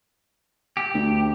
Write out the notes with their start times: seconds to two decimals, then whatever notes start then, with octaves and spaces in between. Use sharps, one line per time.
0.77 G4
0.94 D2